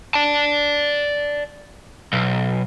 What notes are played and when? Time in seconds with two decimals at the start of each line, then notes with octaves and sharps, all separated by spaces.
0.14 D5 A5
2.13 B1